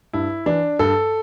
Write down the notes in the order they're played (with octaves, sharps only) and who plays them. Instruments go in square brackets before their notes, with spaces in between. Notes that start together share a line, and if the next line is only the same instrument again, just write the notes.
[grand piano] G2 E4
E3 D4
G2 A4